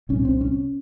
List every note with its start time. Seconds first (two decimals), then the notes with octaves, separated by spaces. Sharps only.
0.09 C2 A#2 C#4
0.25 C4
0.41 C#4